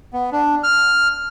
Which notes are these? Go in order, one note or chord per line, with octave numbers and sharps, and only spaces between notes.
B3
D4
F6